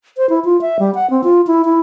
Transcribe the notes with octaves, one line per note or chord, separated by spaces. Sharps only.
C5
E4
F4
E5
G3
F#5
C4
F4
E4
E4